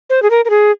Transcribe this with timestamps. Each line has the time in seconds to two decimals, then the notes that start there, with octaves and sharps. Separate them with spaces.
0.10 C5
0.22 G#4
0.30 A#4
0.45 A#4
0.50 G#4